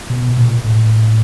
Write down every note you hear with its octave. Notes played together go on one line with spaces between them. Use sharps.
B2
A#2
A2